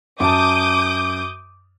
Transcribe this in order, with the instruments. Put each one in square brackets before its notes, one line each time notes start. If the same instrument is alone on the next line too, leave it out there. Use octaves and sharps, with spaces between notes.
[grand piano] F#2 A5 [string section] D6 D#6 G6